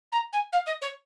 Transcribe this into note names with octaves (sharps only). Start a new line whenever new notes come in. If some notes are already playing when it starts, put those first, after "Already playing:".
A#5
G#5
F5
D#5
C#5